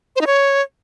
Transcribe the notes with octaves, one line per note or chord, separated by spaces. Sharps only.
C5
D#4
C#5